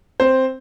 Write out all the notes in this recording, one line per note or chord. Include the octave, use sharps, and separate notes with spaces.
C4 C5